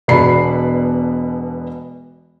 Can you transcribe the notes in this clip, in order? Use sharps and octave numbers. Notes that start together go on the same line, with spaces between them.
E1 B2 F#4 D5 B5 C7